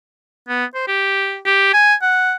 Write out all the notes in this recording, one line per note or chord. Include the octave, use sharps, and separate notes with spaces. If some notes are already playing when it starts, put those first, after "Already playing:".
B3
C5
G4
G4
G#5
F#5